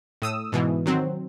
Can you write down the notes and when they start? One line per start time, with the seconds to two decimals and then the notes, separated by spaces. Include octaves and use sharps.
0.22 A2 D#6 E6
0.52 G#2 B2 E3
0.86 D#3 F#3 C4